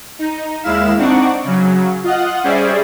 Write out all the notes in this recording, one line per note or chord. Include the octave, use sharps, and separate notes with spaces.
D#4
D#2 G#3 E4 E5 F5 E7
C4 D4 D#4 F#5 C#6 D6
C#3 F#3
F4 D#5 F#5
G3 C#4 G#4 C5 D5 E5